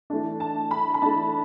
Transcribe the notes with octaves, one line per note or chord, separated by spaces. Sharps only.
E3 A3 D4
A5
B5
B5
E3 A3 D4 A5